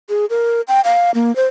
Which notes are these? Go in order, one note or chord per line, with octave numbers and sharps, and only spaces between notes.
G#4
A#4
G5
F5
A#3
C5